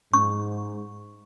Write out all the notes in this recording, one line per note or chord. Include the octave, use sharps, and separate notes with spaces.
G#2 C#6